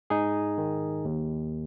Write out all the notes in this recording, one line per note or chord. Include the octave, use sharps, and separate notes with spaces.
G#2 D#4 G#4
D#3
D#2